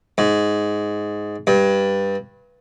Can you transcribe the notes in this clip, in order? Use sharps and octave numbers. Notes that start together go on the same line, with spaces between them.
G#2
G2